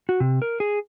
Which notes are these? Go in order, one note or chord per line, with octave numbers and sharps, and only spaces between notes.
F#4
C3
A#4
G#4